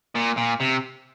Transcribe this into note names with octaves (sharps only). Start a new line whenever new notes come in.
A#2
A#2
C3